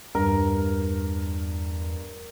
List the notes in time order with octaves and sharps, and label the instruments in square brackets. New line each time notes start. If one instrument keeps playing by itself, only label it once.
[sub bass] E2 [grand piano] G2 [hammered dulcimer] A#4